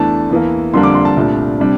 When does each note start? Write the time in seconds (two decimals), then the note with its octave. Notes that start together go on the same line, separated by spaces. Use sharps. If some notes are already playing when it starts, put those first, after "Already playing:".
Already playing: E2 E3 A3 D4 A5
0.30 E2 E3 A#3
0.73 F2 D3 G3 A#3 D4 C6
0.83 D6
0.95 C6
1.05 A5
1.17 C2 A#2 A3 D4
1.60 C3 G3 D4